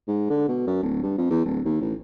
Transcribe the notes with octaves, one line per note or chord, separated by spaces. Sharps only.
G#2
D3
B2
F#2
D1
G2
F2
E2
D1
D#2
A1